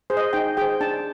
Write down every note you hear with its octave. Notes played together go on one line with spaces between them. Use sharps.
G#4 C5
D#5
D#4 G5
G#4 C5 G5
D4 A5